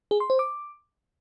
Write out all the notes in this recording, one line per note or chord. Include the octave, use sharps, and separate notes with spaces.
G#4
C6
C5
D6